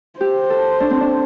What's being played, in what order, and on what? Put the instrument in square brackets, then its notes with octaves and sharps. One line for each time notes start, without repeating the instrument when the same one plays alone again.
[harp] G4 [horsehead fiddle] C5
[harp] A4
D4
C4
D4